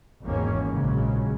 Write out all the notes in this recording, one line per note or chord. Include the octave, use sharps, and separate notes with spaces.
G#1 E2 D#3 A#3 C#4
A#1 C#3 F#3 G#3